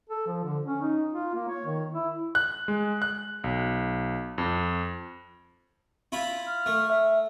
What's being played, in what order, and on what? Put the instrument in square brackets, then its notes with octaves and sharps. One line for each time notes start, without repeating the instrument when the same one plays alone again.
[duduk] A4
F3
D3
C#4
D#4
F4
A#3
C#5
D#3
E4
[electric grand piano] F#6
G#3
F#6
B1
F2
[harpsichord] E4 F4 B5
[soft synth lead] F6
[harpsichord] A3
[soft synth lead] E5